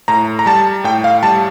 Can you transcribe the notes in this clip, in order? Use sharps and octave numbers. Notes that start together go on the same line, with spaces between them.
A2 A#5
A#5
G3 A5
A2 G5
F5
G3 A5